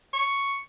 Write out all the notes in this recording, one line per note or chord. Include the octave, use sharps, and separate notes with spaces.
C#6